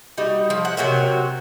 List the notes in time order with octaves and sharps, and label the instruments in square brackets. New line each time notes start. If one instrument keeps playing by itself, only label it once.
[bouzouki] G3 D#4 F#4
F3
F#5
C3 F#3 F#4 A#4